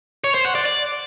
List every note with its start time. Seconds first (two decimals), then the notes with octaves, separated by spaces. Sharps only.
0.24 C#5
0.35 C5
0.45 F#5
0.55 D5
0.65 D5